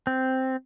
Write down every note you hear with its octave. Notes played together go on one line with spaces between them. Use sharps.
C4